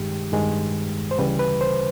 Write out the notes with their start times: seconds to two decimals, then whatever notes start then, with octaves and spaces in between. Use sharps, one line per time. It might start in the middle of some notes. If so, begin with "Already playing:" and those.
Already playing: G2 D#3 G#3 G4
0.32 G2 D#3 G#3
1.11 C5
1.18 D2 C#3 E3 G3 B4
1.39 B4
1.61 C5